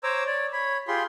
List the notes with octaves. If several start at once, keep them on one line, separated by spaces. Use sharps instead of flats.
C5 C#5 A#5 D6 E6
C#5 D5
C#5 B5
F4 G4 G#4 B5 C6